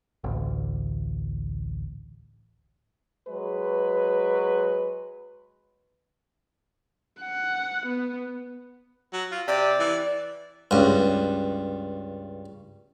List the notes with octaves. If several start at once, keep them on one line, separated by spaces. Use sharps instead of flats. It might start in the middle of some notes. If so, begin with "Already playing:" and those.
A1 D2
F#3 G#3 B4
F#5
B3
F#3
F4
C3 D5
E3
C#2 G2